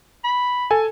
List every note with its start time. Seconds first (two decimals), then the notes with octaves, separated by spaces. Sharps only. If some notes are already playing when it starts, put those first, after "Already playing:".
0.24 B5
0.71 A4 G#5